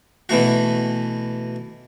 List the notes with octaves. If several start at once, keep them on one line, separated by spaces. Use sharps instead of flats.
B2 E3 A3 F#4